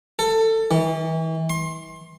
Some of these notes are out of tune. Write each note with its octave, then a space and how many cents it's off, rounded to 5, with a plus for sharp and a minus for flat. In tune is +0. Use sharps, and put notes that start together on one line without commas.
A4 +20
E3 -35
C6 +30